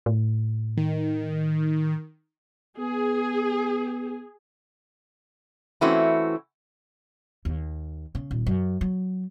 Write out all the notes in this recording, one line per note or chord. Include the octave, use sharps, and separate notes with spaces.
A2
D#3
B3 G#4
E3 A3 C4 C#4 E4 F#4
D#2
C#3
D#1
F#2
F#3